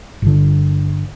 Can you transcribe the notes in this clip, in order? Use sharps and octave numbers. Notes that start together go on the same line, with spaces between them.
G1 D3